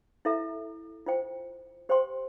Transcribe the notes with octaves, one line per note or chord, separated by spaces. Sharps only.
E4 A4 E5 A#5
F4 C5 G5
G4 C5 G5 C6